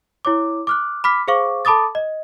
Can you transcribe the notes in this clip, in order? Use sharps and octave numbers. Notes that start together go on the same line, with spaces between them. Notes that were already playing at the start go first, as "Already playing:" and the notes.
E4 C#5 D6
D6 F6 F#6
B5 D6 F6 B6
G#4 C5 F5 C#6 D6
A4 A5 B5 D6 D#6 A6
D#5